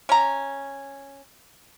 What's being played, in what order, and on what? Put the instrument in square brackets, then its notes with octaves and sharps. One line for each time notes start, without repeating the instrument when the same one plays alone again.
[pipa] C#4 A#5